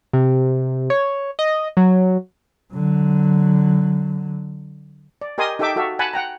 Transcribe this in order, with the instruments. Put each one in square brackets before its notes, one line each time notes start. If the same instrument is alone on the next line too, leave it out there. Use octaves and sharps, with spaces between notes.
[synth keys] C3
C#5
D#5
F#3
[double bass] D3 F#3
[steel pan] D5
G4 A#4 D#5 G#5 C6 D#6
D#4 G4 A4 E5 G5 D6
F#4 A4 E5 F5
F#5 G#5 A5 B5
F#5 G5 A#5